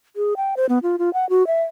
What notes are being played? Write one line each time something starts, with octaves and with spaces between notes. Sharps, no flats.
G#4
G5
C5
B3
F4
F4
F#5
F#4
E5